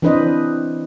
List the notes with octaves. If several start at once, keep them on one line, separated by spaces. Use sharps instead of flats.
E3 C4 D4 B4 C5 D#5